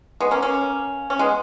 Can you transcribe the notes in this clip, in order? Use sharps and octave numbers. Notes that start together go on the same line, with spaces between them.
G#3 B3
A#3 C#4
A#3 C#4
C#4
G#3 B3